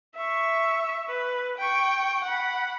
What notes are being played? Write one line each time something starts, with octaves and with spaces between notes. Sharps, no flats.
E5 C#6
B4
G5 C#6
F#5 B5